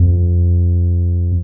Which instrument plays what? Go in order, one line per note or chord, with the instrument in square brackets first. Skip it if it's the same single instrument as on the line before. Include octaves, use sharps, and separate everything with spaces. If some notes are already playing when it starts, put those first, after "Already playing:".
Already playing: [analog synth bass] F2